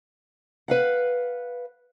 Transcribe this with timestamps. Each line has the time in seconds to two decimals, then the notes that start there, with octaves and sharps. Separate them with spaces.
0.68 B4 F5 F#5